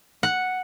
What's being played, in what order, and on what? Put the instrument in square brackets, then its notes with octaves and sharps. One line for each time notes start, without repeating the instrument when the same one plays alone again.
[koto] F#5